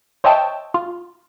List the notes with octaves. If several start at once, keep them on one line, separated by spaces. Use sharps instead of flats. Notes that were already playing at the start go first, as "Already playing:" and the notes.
C5 C#5 D#5 E5 G5 A5
F4